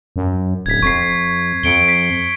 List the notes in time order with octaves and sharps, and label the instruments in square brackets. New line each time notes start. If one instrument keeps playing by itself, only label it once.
[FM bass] F#2
[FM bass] D1 [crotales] G#6 B6
[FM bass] F2 [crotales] C#6 B6 C7
[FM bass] F2 [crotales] C#7 D7 G7
[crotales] B6 C7